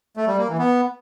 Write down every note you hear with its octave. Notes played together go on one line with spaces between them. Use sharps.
A3
G3
A#3
E3
B3